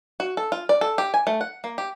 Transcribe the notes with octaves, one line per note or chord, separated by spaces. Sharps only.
F#4
A4
F4
D5
A4
G4
G#5
A3
F#5
A#3
G4